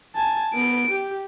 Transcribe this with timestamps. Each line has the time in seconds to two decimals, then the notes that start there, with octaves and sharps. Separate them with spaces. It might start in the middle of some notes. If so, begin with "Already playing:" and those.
0.15 G#5 A5
0.54 B3 D7
0.91 G4